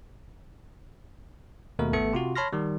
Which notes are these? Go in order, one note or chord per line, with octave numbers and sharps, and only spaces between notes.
D#2 B2 A3 A#4
G#1 A3 B3 A4 C#7
C3 F4 F#4
C#5 A5 B5 C6 F6 A#6
D#3 G3